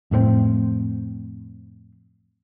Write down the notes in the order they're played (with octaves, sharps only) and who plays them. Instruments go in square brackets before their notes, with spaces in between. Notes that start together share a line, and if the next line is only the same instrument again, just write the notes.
[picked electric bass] F2 A2 A3 C4